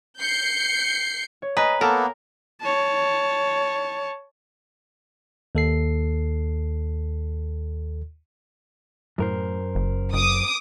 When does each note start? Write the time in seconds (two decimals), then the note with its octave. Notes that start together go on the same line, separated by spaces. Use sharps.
0.21 G6 C7 C#7
1.42 C#5
1.57 B4 D#5 G#5 A#5
1.81 A#3 B3 A4 A#4 A5
2.61 C#5 A5
5.55 D#2 A4 C7
9.18 F#2 A2 A#4 C5
9.75 F#1
10.13 F#1 D6 D#6